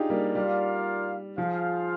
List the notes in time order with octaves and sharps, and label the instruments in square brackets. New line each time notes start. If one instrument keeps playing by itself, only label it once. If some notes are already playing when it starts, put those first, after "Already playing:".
Already playing: [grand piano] D4 D#4 F4 G4 G#4
G3 A#3
[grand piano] G3 [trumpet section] F4 A#4 D5 F5
[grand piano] F3 [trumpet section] F4 G#4 C5 F5